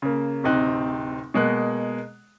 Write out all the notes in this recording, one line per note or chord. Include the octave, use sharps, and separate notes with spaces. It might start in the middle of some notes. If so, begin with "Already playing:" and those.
C#3 A#3
D1 C3 C4 D#4 F#6
B2 G#3 A#3 F#6